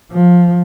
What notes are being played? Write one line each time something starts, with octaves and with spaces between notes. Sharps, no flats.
F3